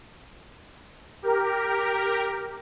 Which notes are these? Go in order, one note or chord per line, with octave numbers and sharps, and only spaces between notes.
G4 A#4